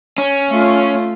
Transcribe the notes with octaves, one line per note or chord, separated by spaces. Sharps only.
C#4
A3 F4